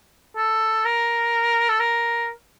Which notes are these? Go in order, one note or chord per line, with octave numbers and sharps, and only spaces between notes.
A4
A#4
A4
A#4